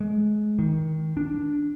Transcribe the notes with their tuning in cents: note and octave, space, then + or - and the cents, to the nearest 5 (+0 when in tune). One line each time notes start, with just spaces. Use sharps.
G#3 +25
D#3 +25
D4 -5